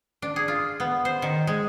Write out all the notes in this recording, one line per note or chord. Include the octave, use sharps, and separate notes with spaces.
D4
G#4
F4
B3
C5
D#3
G#3